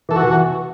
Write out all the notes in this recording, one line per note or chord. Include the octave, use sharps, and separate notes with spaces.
E3 A4
F#4
E3